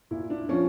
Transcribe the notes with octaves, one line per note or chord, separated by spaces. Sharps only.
A#2 E4
D4
F3 C#4